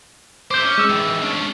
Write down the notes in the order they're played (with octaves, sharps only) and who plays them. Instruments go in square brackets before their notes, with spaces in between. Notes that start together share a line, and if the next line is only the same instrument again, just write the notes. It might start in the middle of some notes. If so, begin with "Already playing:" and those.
[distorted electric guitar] C5 E5 [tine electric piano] D6 G6
[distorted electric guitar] C#4
[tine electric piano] G#3 E6
[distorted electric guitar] D#3 E3
C#4 D4